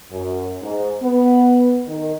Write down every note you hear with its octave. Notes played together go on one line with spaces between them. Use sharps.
F#2
G#2
B3
D#3